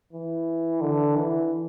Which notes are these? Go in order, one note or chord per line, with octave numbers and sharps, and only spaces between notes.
E3
D3
E3